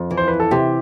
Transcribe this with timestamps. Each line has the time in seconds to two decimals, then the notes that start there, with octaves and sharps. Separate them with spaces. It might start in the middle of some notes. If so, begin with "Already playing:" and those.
Already playing: F2
0.11 E3
0.17 C5
0.28 B4
0.40 A4
0.51 C3 G4